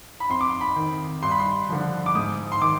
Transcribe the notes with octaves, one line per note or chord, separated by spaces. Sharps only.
B5
F2 C6
D6
C6
B5
D#3
G2 C6
B5
C6
D3 F3
D6
G#2 D#6
C6
D#3 D6